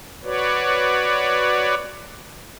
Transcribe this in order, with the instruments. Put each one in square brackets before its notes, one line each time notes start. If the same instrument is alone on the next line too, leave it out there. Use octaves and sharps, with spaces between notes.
[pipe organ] F#4 B4 C#5 D5